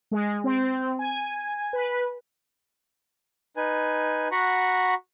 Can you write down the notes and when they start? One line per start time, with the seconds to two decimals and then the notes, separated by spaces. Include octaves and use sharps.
0.11 G#3
0.44 C4
0.99 G#5
1.73 B4
3.57 D#4 B4 G#5
4.32 F#4 F#5 A#5 B5 C#6